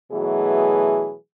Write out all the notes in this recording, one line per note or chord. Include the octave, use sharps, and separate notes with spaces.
B2 E3 F#3 A3 G#4